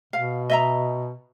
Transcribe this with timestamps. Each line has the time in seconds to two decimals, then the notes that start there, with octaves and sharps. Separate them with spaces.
0.13 B2 F5
0.50 D#5 E5 A#5